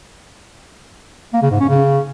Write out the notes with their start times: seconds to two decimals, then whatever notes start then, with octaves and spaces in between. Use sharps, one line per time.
1.34 A#3
1.42 C#3
1.51 G#2
1.60 C#4
1.69 C#3